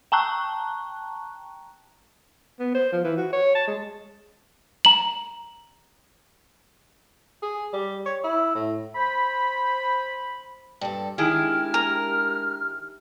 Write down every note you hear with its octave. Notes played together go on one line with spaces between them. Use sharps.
G5 A5 A#5 C#6 F#6
B3
C5
F3
E3
F#4
C#5
A5
G#3
A#5 F#7
G#4
G3
C#5
E4
A2
C5 B5
G2 A4
D#3 G#3 D4 E4 G4 G#4 F6
A#4